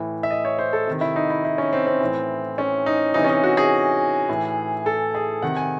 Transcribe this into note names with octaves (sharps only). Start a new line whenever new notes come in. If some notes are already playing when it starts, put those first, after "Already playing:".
Already playing: A2 E3
E5
D#5
C#5
C5
A4
C3 D#3
E4
D#4
E4
E4
C#4
C4
C4
A2 E3
C#4
D#4
C3 E3 D#4
C#4
D#4
F#4
G#4
A2 E3
A4
G#4
C3 D#3 F#5
G#5